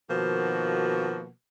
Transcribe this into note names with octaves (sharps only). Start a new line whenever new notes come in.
B2 D#3 F3 A#3 F#4